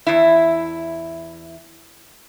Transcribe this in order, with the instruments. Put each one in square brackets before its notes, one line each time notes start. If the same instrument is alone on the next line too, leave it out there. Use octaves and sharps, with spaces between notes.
[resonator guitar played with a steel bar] E2 E4